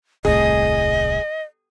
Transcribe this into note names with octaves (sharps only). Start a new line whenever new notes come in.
D#1 C2 A2 G#4 D#5